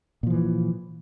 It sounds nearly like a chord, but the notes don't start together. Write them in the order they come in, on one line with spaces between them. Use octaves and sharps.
A#2 F3 E3